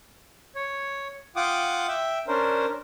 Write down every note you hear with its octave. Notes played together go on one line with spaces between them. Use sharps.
C#5
F4 F#5 G5 D6 D#6
E5 G5
C#4 D4 A#4 C5